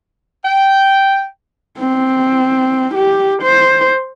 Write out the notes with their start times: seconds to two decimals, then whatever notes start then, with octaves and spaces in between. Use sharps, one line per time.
0.45 G5
1.79 C4
2.94 G4
3.42 C5